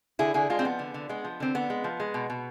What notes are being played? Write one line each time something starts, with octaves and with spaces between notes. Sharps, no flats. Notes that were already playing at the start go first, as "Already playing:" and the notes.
D3 E4 G#4
D3 E4 G#4
G#3 D4 F4
C4
F3 B3
D3
D3
G#3 B3
F3
D3 C4
D3 B3
G#3
F3
G#3
B2
B2